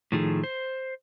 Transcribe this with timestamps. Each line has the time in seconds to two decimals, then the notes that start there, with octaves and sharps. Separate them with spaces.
0.12 A2 D#3 F3 A3 D#4 G#4
0.44 C5